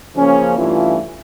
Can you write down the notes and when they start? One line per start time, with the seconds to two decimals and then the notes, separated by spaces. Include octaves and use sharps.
0.14 C#3 F3 A#3 C#4
0.55 G2 E3 A3 C#4 F4